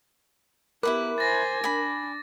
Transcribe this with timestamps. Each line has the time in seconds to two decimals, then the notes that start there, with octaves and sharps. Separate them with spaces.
0.83 B3 E4 F4 G4 A#4 B4 D6
1.18 C5 G#5 A6 A#6
1.64 D4 G#5 B5